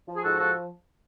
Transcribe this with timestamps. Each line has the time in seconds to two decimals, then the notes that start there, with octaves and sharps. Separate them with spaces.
0.08 F3
0.16 G#4
0.23 G#2 F#4 A4
0.39 F3 F#4 A4